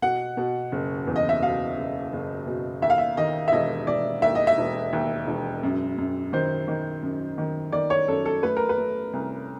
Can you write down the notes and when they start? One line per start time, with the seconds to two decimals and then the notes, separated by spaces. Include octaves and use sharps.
0.02 B2 F#5
0.37 B2
0.72 F#1
1.07 E2
1.16 D#5
1.29 E5
1.42 B2 F5
1.77 F#1
2.13 F#1
2.47 B2
2.82 D#2 E5
2.90 F5
2.98 E5
3.17 D#3 D#5
3.48 E5
3.52 E1 D#5
3.87 E1 D5
4.22 D#2 E5
4.35 D#5
4.47 E5
4.58 E1
4.93 D#2
5.27 E1
5.63 F#2
5.98 F#2
6.33 D#3 C5
6.68 D#3
7.03 F#2
7.38 D#3
7.72 D#3 D5
7.90 C#5
8.08 F#2 A4
8.25 A4
8.43 A3 B4
8.57 A#4
8.69 B4
8.78 A3
9.13 C2